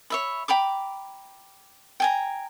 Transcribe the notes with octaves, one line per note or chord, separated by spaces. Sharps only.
C#5 E5 B5
G5 A#5 B5 D6
G5 G#5 A#5